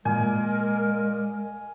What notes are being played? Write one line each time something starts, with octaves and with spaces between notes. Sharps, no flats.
A#2 G#3 A#4 G#5